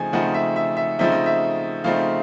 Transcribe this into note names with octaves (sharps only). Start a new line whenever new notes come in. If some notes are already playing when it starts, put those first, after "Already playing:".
Already playing: C#3 F3 A3 C4 D#4 G#5
C#3 F3 A3 C4 D#4 F#5
E5
E5
E5
C#3 F3 A3 C4 D#4 E5
D#5
E5
C#3 F3 A3 C4 D#4 F5